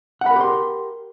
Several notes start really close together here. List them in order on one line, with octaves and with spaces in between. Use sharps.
F#5 B5 A#4 G4 C6